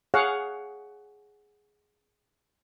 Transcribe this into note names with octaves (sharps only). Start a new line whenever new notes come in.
G#4 C#5 F5 F#5